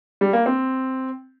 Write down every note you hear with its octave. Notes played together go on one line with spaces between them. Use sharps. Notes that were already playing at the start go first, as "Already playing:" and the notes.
G3
A#3
C4